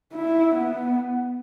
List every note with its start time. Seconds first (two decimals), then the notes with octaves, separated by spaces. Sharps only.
0.15 E4
0.55 B3